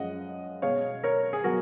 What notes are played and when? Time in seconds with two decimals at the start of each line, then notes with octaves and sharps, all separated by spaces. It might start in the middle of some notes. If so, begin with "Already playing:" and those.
Already playing: F#2 F3 G#3 D#5 F#5
0.62 B2 G#3 C#5 F5
1.04 A#4 C#5
1.33 G#4
1.44 B2 F#3 F#4 A#4